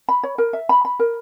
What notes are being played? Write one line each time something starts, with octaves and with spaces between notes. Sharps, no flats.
B5
C#5
A#4
E5
B5
B5
A#4